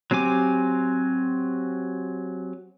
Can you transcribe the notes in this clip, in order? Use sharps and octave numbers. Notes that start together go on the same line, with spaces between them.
F#3 C4 G4 G#5 D6